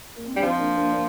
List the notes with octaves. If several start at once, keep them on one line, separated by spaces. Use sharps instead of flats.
A#3
C4
G3 D4
F3 C4 D#4
A#3 D4
A#3 D4
A#3 D4